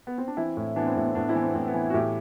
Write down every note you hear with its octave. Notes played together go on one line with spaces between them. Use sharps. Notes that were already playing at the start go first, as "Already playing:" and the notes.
B3
C4
D4
E3 C4 E4
A2
E3 B3 D4
C4
A2 B3
C4
A2 B3 D4
C4 E4
E3
C4
B3
A2 C4
B3
E3
F#4
A2 E4 G4